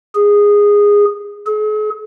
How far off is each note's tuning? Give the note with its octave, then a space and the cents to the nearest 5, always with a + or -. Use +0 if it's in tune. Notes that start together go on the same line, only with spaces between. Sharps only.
G#4 -15
G#4 +45